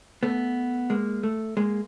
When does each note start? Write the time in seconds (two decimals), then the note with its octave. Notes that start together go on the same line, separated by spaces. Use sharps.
0.23 A3 B3
0.90 G#3 A#3
1.23 A3
1.57 G#3 A#3